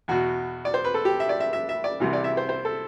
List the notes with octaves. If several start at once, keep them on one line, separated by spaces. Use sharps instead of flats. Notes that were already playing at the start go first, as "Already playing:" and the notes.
E2 B2 F#4
D5
C5
B4
A4
G4
E5
D5
E5
E5
E5
D5
C2 C3 E3
D5
E5
C5
C5
A4